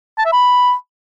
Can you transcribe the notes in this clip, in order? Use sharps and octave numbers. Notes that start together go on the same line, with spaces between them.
A5
E5
B5